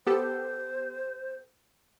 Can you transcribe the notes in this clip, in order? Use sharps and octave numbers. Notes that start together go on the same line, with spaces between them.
B3 G4 A4 C5